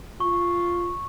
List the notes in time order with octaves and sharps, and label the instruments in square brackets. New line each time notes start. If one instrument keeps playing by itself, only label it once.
[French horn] F4 [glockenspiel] C#6